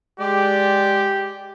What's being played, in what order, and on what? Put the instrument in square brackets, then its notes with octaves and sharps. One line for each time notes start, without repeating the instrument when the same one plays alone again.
[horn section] G#3 D5 [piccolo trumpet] G4